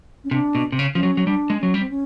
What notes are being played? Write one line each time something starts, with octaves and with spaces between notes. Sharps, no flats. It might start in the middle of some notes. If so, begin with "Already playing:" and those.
C#4
C3 D4
B2
C3
C#3
F3 C#4
F#3
F#3
G3 D4
G#3
F#3 C#4
G3
C4
C#4